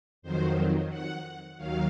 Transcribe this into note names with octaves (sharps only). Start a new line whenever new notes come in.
F2 D#3 F#3 C5
F#5
D#2 D#3 F#3 F5